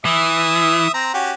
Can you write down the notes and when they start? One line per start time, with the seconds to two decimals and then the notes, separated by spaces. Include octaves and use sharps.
0.05 E3 E5 D#6
0.94 C4 A#5
1.14 C#4 F#4 G4